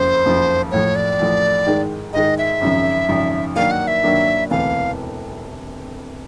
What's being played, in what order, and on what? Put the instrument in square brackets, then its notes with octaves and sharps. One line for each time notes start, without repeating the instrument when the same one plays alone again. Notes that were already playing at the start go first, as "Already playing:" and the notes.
Already playing: [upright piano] F#1 F2 C#3 F3 [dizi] C5
[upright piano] F#1 F2 C#3 F3
[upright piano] A1 A2 F3 [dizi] C#5
[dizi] D5
[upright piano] A1 A2 F3
G#2 D#3 G#3
[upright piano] G#2 D#3 G#3 [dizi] D#5
[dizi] E5
[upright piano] G#1 F#2 C#3 F3
G#1 F#2 C#3 F3
[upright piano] G2 D#3 F#3 A#3 D4 [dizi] F5
[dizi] F#5
E5
[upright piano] G2 D#3 F#3 A#3 D4
[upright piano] E1 D2 C3 E3 [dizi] F5